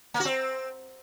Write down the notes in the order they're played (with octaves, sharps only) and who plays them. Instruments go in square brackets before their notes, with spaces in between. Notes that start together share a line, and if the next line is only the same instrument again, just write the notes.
[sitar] A#3
F#4
C4